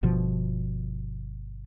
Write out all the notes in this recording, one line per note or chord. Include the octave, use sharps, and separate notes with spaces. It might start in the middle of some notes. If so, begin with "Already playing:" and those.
G1 B2 F3